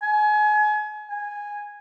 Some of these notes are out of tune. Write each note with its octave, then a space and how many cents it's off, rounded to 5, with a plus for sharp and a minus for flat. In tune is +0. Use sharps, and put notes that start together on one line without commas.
G#5 +30
G#5 -10